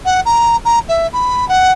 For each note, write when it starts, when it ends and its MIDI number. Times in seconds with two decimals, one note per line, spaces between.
0.05 0.20 78
0.25 0.56 82
0.65 0.79 82
0.88 1.06 76
1.12 1.47 83
1.48 1.71 78